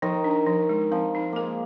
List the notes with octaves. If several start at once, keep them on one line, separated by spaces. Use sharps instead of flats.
D#3 F3
D4
F3
G#3
F3 C4
D#4
G#3 A#3 A#4